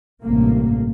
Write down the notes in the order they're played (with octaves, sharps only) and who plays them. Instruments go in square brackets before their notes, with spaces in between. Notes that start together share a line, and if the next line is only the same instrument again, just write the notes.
[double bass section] A1 G2 C3 A#3